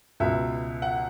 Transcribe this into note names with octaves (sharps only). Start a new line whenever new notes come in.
C#2 B2 E5
F#5